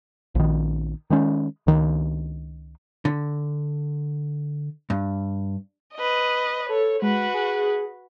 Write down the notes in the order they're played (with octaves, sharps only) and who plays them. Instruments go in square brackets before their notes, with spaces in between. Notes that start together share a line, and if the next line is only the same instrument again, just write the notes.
[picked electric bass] A#1 D#3
D#3 G#3 C#4
C#2 D#3
[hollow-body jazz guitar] D3
G2
[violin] B4 D#5
[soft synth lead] A4 [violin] C#5
[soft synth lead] G#3 [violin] F#4 B4
[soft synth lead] G#4